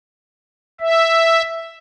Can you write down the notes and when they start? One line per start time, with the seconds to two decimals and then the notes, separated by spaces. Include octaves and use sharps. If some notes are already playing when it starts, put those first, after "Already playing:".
0.80 E5